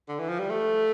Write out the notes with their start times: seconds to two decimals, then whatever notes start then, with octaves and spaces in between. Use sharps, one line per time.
0.08 D3
0.19 E3
0.29 F3
0.39 G3
0.50 A3